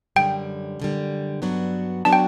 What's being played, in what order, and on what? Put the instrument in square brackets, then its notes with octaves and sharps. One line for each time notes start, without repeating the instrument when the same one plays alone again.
[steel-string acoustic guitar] F#2 D3 G3 [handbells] G5
[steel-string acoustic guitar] F#2 D3 G3
G2 F#3 B3 D4 F#4
[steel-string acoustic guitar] F#3 B3 D4 F#4 [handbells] A5
[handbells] G5